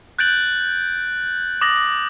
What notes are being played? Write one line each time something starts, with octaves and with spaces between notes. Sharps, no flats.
F#6 G6 A6 D7 F#7
D6 D#6 A6 A#6 F#7